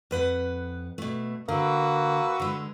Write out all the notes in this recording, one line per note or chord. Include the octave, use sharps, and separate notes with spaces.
F2 B4 F#5
B2 A3
D3 A#3 F#4 B4 E6
D3 G#3